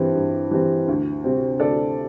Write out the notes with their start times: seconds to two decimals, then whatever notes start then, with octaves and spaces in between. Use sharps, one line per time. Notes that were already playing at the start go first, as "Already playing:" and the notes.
Already playing: G2 E3 G3 C4
0.15 G2
0.51 E3 G3 C4
0.88 D2
1.24 C3 G3 C4
1.59 D2 A4 D5